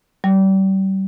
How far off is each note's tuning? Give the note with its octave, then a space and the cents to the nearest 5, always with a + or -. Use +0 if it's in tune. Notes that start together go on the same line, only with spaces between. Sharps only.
G3 -35